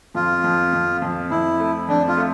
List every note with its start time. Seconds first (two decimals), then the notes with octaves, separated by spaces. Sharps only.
0.15 F2 F4
0.44 F2
0.73 F2
1.02 F2
1.30 F2 E4
1.60 A3
1.88 F2 D4
2.08 F4
2.17 A3